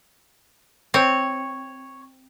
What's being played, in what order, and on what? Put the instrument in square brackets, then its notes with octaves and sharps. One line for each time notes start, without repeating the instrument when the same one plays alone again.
[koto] C4 [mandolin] C#5